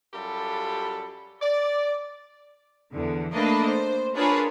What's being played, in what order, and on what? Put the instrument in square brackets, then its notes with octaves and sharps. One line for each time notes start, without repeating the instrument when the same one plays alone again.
[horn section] F#2 G3 F4 G4 A4 B5
D5
[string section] E2 D3
A3 A#3 D4 B4 D#5
C5
D4 F4 G#4 A#4 B4 C#5